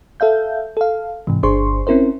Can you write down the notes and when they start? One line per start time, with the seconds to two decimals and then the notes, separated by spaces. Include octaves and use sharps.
0.20 A4 E5 F5 G6
0.77 A4 F5
1.27 G#2 C3 E3
1.43 G1 D4 G#4 C5 C6 C#6
1.87 C4 C#4 E4 A#4 C5